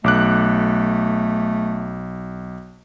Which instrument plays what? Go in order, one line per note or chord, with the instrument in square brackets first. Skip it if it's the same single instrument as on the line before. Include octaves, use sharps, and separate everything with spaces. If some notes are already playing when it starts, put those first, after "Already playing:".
[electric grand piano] B1 D6 F#6 [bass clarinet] A3